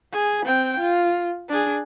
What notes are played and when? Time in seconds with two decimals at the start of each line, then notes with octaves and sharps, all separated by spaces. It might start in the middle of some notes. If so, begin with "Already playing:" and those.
0.13 G#4
0.46 C4 G5
0.79 F4
1.49 D4 G#4